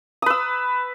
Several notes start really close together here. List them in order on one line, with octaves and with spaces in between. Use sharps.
D#6 B4 E6